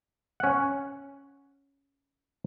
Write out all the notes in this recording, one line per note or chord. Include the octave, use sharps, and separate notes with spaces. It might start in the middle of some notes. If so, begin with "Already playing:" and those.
C#4 F#5